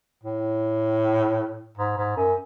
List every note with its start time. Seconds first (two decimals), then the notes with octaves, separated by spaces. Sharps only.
0.23 A2
1.77 G#2
1.97 G#2
2.17 F#2